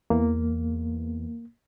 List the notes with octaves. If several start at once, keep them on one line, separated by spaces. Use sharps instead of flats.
E2 A#3